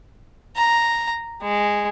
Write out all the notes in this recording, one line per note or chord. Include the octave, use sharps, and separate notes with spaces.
A#5
G#3